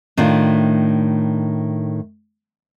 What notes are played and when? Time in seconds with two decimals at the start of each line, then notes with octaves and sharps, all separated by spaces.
0.17 A2 D#3 A3 D4 F4